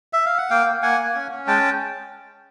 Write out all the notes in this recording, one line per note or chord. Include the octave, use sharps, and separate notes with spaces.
E5
F5
F#5
A#3 F5 G5
A#3
A#3 F#5 G#5
A#3
C#4
C#4
G#3 G5 A5